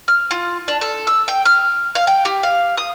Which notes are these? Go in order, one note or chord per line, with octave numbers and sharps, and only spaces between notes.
F6
F4
D4
A4
E6
G5
F6
F5
G5
G4
F5
D#6